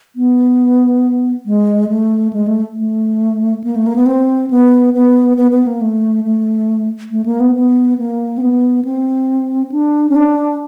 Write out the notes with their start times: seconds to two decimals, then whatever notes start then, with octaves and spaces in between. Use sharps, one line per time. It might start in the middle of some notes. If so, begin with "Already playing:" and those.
0.16 B3
1.46 G#3
1.89 A3
2.33 G#3
2.47 A3
2.76 A3
3.64 A#3
3.76 A3
3.87 A#3
3.96 B3
4.06 C4
4.50 B3
4.94 B3
5.37 B3
5.51 B3
5.67 A#3
5.81 A3
6.24 A3
7.11 A3
7.26 A#3
7.40 B3
7.55 B3
7.98 A#3
8.38 C4
8.41 B3
8.85 C4
9.72 D4
10.09 C#4
10.16 D4